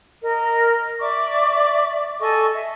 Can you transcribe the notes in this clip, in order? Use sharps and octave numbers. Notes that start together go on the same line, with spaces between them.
A#4 D#5
D5 E5 C#6 D6
A4 D#5 G#5 C#6
E5